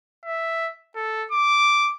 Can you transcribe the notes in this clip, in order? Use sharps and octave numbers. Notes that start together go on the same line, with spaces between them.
E5
A4
D6